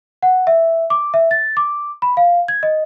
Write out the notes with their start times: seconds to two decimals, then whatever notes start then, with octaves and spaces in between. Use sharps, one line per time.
0.23 F#5
0.47 E5
0.90 D6
1.14 E5
1.31 A6
1.57 D6
2.02 B5
2.17 F5
2.48 G#6
2.63 D#5